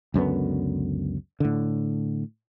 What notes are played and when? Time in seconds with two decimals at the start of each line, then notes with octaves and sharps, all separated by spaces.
0.14 C#2 F#2 D3 B3
1.40 A2 D3